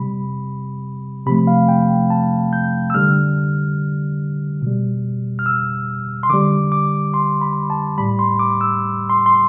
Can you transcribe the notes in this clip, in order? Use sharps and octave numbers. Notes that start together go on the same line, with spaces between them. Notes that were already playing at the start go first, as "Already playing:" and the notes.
Already playing: C3 G3 B5
C3 F3 A3 B5
F5
G5
A5
G6
E6
D3 G3 F6
B2 G3
F6
E6
C6
D3 G3 D6
D6
C6
B5
A5
A2 G3 B5
C6
D6
E6
C6
C6